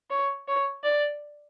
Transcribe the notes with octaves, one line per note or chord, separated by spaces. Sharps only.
C#5
C#5
D5